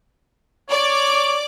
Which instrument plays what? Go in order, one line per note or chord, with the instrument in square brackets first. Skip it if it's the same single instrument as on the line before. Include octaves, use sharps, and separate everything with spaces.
[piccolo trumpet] C#5 [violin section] D5 D6